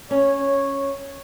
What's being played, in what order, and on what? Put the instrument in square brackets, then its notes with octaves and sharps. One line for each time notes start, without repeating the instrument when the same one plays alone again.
[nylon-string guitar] C#4 [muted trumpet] C#5